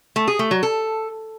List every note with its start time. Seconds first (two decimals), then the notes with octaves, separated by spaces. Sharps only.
0.16 A3
0.28 G#4
0.39 A3
0.51 F#3
0.63 A4